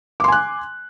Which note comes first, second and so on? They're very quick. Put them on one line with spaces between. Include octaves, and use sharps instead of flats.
D6 C6 G#5 F#6